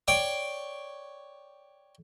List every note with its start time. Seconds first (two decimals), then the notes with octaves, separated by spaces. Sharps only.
0.08 C#5 D5 G5